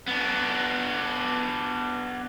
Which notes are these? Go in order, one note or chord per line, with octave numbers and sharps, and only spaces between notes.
B3 D4